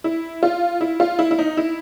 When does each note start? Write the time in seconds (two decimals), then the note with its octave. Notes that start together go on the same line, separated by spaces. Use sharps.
0.04 E4
0.43 F4
0.81 E4
1.00 F4
1.19 E4
1.31 E4
1.39 D#4
1.57 E4